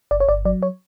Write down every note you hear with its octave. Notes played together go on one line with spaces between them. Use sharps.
G1 D5
C#5
G1 D5
F#3 D5
C#5